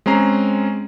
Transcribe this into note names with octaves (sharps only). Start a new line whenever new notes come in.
G#3 C4 C#4 A#5 C7